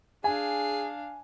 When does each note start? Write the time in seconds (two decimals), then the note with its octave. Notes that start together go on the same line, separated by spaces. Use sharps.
0.24 D4 G#4 F5 G#5